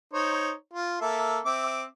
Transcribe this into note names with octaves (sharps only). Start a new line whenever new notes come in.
D#4 C5 C#5
F4
A#3 A4 E5
C4 E5 D6